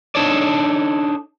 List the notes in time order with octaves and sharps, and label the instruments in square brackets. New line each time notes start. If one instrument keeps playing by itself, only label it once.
[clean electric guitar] D4 D#4 A4 C#5 D5